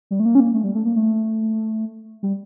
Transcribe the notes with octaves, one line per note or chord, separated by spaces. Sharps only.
G3
A3
A#3
C#4
A#3
A3
G3
A3
A#3
A3
G3